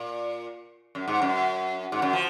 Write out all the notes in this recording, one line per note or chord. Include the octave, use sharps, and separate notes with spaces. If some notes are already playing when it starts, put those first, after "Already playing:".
Already playing: A#2
F#2
G#2
F#2
G#2
F#2
F3